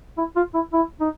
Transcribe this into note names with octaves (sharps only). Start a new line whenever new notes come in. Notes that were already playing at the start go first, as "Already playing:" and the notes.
E4
F4
E4
E4
D#4